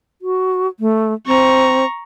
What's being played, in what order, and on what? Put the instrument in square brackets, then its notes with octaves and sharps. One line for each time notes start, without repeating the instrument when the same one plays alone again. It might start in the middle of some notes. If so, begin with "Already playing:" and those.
[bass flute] F#4
A3
[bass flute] C4 [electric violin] A#5 C#6